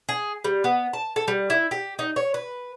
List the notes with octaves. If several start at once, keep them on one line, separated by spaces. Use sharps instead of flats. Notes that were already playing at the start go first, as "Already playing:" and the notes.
G#4
G3
B3
A5
A4
G3
E4
G4
D#4
C#5
B4